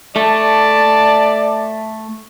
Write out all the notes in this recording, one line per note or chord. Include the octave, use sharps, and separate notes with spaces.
A3 D5 A5